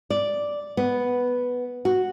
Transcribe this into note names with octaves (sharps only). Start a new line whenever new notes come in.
D5
B3
F#4